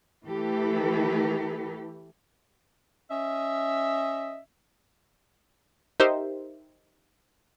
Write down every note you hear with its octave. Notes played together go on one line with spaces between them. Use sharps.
E3 A3 G4 A4 B4
C#4 D#5 E5
D#4 G4 A#4 C5 E5